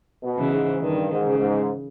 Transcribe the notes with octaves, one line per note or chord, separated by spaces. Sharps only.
B2
C#3 E3
G#2
G2 D#3
G#2
C#3
G#2